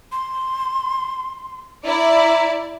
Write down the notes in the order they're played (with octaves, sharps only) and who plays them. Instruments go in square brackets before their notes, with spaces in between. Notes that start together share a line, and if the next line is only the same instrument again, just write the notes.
[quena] C6
[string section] E4 D5 [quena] A#5